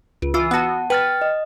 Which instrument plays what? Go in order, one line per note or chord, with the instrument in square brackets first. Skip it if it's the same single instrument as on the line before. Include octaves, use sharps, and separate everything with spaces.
[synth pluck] C#2
[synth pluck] E3 F4 [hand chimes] E6
[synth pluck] B3 F#4 [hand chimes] F#5 A5
[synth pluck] B4 [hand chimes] G5 F6 A6
[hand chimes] D#5